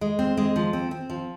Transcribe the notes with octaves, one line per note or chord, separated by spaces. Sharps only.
G#3
C4
G#3
F3
C4
C4
F3